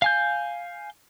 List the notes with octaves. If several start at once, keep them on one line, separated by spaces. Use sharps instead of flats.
F5 G#5 G6